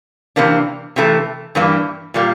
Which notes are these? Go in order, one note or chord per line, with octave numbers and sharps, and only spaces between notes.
C3 E3 A#3 D4
C3 E3 A3
G2 E3 G3 A#3
A#2 G3 A#3